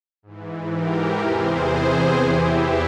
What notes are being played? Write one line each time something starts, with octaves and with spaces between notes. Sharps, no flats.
G#2 E3
G4 A#4
E2 C3 E3 G#4 C5
E2 E3 E4 G4